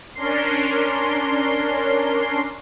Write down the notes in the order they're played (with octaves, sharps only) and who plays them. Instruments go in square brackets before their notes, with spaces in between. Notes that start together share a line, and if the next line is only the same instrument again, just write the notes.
[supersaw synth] C#4 D4 A#4 C6 C7